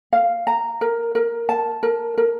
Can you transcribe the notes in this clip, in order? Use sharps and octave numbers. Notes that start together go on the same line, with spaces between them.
F5
A#5
A#4
A#4
A5
A#4
A#4